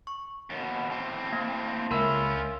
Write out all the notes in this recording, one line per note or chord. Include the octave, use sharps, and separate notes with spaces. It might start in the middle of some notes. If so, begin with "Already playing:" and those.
C#6
D#2 B2
A2 C4
A#3 F5
C#2 C#4 F4 A#4 E5 B5 E6